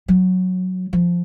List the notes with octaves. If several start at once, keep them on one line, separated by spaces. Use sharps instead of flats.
F#3
F3